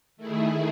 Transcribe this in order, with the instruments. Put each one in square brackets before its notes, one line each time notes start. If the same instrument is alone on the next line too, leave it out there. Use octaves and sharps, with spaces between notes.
[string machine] D#3 A3 E4 G#4